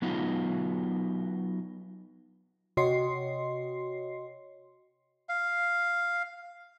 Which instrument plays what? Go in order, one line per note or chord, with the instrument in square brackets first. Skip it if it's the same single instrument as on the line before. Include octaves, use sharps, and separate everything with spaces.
[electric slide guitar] F#3 B3 D#4 F4
[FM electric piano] C3 F#4 C#5 D#5 C6 C7
[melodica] F5